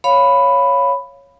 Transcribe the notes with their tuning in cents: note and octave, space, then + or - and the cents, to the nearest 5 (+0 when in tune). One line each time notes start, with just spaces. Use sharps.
C#5 +0 F5 +0 B5 +5